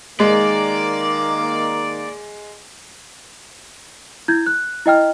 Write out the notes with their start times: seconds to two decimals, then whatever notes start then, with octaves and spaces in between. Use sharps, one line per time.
0.20 D#3 G#3 A#3 D5
4.28 E4 G6 G#6
4.46 F#6
4.86 E4 D#5 G5 F6